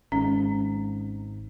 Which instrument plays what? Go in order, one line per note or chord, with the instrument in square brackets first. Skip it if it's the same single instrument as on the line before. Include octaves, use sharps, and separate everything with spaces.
[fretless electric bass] G#1 G#2 [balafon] C#4